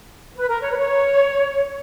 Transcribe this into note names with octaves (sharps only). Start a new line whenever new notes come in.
B4
A#4
C#5
B4
C#5